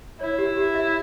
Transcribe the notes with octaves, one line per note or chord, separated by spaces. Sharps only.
E4 C#5
G4
G4
E5